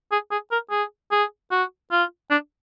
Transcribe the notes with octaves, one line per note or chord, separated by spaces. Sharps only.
G#4
G#4
A#4
G#4
G#4
F#4
F4
D4